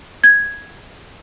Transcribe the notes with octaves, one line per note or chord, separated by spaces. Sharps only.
G#6